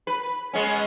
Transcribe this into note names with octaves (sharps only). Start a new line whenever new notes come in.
B4
G#3 B3 C#4